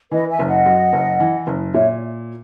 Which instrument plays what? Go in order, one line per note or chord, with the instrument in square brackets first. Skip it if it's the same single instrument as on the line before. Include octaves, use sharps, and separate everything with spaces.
[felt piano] E3 [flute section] B4 D#5
[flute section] E5 G#5
[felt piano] F#1
[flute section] D#5 F#5
[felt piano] F#2
F#1
E3
F#1
[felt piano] A#2 [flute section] C#5 E5